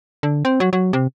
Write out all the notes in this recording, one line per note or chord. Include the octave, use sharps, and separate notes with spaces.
D3
C4
F#3
F#3
C3